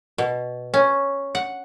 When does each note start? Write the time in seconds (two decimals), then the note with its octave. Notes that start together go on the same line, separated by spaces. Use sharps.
0.18 B2
0.74 C#4
1.35 F#5